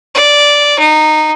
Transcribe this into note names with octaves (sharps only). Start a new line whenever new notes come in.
D5
D#4